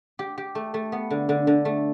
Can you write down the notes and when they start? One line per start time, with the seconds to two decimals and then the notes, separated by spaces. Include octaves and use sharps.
0.19 G4
0.38 G4
0.55 A3
0.74 A3
0.92 B3
1.10 D3
1.29 D3
1.47 D3
1.65 A3